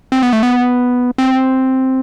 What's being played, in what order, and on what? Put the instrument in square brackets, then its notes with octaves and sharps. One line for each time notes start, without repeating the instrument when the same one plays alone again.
[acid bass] C4
B3
A3
B3
C4